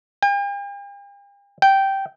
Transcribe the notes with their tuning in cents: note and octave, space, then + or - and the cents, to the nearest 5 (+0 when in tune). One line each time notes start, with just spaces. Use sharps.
G5 +45
G5 -10